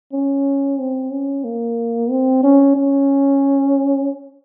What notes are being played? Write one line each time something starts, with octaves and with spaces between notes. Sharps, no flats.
C#4
C4
C#4
A#3
C4
C#4
C#4